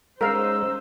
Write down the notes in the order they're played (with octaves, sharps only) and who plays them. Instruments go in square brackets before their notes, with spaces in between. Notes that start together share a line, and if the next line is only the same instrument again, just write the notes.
[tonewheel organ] G#3 [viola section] C#4 D#4 C5 [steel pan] A#4 F5 [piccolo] E6